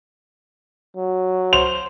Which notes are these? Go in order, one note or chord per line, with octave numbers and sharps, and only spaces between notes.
F#3
C5 F7